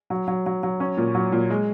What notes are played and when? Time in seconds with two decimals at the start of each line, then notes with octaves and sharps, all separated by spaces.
0.10 F#3
0.28 F#3
0.46 F#3
0.63 F#3
0.80 C#4
0.97 A#2
1.15 F#3
1.32 A#2
1.50 G#3